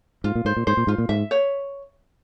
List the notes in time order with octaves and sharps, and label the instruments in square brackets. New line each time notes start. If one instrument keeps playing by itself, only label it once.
[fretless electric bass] G#2 [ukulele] F4
[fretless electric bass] A#2
[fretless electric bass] G#2 [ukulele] C5
[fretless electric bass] A#2
[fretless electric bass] G#2 [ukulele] C5
[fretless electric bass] A#2
[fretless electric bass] G#2 [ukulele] F4
[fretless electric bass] A#2
[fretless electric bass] G#2 [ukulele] E5
[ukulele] C#5